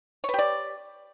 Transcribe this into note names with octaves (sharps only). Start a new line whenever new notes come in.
G4 B4 C#5 D5